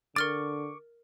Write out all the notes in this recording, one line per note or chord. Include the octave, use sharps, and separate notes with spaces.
D3 A#4 C#6 D6 F6 A6